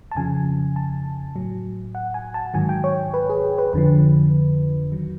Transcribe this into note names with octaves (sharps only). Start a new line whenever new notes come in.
A5
F2 C#3 F3 G#5
A5
A2 F#3
F#5
G#5
A5
G#2 D#3 F#3 G#5
G5
C#5
B4
G#4
B4
F2 D3 F3 B4
D#3 F#3